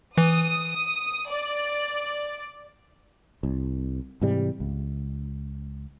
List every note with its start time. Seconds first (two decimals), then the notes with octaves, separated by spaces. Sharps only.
0.18 E3 D#6
1.29 D5
3.43 C2
4.21 G#2 C3 E3 G3
4.60 C#2